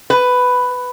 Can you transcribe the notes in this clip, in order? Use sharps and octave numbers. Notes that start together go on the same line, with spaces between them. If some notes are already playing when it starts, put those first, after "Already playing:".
B4